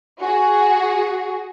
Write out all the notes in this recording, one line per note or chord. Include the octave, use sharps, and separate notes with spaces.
F#4 G#4